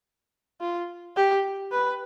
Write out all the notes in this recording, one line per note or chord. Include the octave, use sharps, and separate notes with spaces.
F4
G4
B4